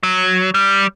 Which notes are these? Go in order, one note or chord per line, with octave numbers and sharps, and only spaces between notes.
F#3
G3